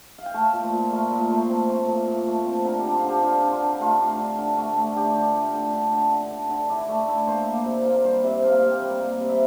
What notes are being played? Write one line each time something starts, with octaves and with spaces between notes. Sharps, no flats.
F5
G5
A3 A5
A#2
C5
A#2
A3 A#4
A#2 A#4
A3 C5
C4
A3
A#2
A#2
A3
C4
D3 A#4
G4
D4
F4
D3 G4
D3 F4
D4
F4
D3
A3 F4
D4
D3
D3
A3
A3
D3 G4
D3
A3
D3
D3
D3
D3
D3
D3
E4 D5
A3
E4
A#3 C5
A#3
C3
A#3 A#4
G3 C5
C3 E5
A#3 F5
C3
G5
G3
A#3
C3
E5